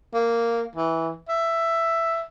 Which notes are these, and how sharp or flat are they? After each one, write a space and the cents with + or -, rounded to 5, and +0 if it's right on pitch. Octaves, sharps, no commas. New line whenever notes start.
A#3 -5
E3 -10
E5 +10